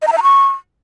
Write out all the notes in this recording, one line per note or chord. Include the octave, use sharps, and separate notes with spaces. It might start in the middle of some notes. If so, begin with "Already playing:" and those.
D#5
A#5
E5
A#5
C#6